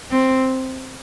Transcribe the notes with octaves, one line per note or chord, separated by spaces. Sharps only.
C4